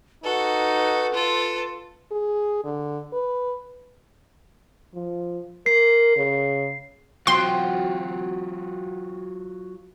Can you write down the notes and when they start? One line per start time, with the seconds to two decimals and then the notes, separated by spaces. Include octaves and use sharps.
0.24 D#4 F#4 A4 B4
1.13 F4 A4
2.12 G#4
2.65 D3
3.13 B4
4.94 F3
5.66 A#4 C7
6.17 C#3
7.27 F#3 C4 F4 F#4 G5 C6